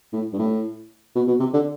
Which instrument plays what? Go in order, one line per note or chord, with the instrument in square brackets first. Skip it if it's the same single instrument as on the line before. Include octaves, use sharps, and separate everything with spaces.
[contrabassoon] A2
G2
A2
B2
B2
C3
D3